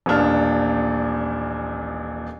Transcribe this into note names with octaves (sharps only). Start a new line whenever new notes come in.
D#1 A1 A#2 D4 F6